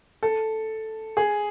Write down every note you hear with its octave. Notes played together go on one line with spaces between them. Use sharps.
A4
G#4